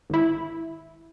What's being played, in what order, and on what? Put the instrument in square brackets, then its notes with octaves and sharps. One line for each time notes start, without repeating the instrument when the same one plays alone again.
[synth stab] G#1 E4